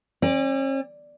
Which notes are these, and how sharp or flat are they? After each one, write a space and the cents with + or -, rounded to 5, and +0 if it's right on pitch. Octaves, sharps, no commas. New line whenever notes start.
C#4 -45 D5 +0